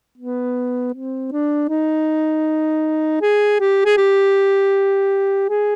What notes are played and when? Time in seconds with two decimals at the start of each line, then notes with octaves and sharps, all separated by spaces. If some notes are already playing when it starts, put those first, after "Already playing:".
0.17 B3
0.94 C4
1.32 D4
1.68 D#4
3.21 G#4
3.60 G4
3.85 G#4
3.97 G4
5.49 G#4